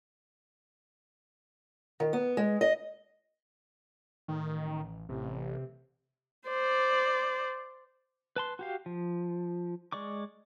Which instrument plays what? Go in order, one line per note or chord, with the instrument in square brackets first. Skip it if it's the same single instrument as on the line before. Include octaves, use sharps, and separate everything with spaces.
[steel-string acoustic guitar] D#3
B3
G#3
D#5
[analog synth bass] A1 [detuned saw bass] D#3
[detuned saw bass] A1 [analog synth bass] C3
[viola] C5 D5
[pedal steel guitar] B4 A5 C6
F#4 G4 F5
F3
G#3 D5 C#6 D6